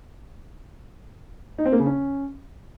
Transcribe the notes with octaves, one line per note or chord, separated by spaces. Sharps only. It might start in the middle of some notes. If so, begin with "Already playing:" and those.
D#4
C4
A#3
C#3
C#4